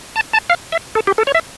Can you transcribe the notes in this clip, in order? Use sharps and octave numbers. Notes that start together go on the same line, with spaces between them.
A5
A5
F5
E5
A4
G4
A4
C#5
E5